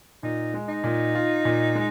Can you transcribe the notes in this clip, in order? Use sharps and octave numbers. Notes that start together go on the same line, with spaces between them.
A#2 D#4
G#3
D#4
A#2
F4
A#2
G#3